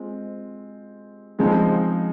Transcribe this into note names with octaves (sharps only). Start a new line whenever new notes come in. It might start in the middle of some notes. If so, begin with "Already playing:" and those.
Already playing: G#3 C4 F4
C#3 F3 G#3 C4 D#4